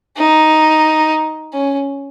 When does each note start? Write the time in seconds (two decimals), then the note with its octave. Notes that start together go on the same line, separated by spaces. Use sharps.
0.17 D#4
1.53 C#4